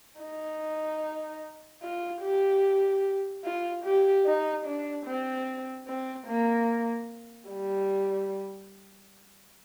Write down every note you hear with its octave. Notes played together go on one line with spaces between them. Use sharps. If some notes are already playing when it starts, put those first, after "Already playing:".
D#4
F4
G4
F4
G4
D#4
D4
C4
C4
A#3
G3